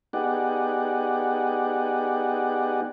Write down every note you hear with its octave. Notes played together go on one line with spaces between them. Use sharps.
B3 D#4 G4 G#4 D5 F#5